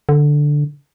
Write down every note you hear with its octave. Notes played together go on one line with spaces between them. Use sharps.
D3